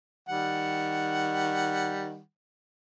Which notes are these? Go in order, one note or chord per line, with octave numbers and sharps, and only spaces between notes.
D#3 G3 F#5